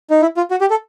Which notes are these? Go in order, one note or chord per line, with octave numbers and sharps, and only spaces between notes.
D#4
E4
F4
F#4
G4
A4